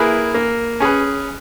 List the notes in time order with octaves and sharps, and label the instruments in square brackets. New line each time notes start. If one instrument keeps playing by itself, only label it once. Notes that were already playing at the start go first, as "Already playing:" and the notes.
Already playing: [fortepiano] A#3 E4 G#4 B4
A#3
C#4 G#4 B4